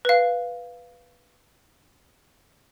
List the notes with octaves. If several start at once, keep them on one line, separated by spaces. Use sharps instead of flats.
B4 F5